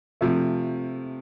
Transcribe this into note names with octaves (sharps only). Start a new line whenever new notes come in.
C3 F3 A3